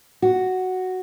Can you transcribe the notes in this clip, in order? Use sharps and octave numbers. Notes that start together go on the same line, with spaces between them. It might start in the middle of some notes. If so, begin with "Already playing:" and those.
F#4